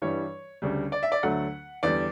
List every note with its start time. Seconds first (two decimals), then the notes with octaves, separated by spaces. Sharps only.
0.02 G2 E3 G3 C#5
0.62 D2 C#3 G3
0.92 D5
1.03 E5
1.12 D5
1.23 D2 D3 F#3 A3 F#5
1.83 E2 D3 G3 D5